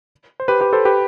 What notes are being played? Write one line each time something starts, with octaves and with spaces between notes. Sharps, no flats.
C5
G4 B4
G4 B4
A4 C5
G4 B4